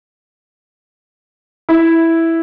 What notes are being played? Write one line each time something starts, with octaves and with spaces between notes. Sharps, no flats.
E4